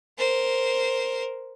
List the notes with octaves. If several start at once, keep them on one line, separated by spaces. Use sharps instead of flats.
A#4 C5